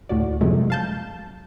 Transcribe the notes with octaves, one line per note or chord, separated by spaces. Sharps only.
D2 A2 F#4 D5
F#2 C3 F3 G#3 A3
F5 A5 G6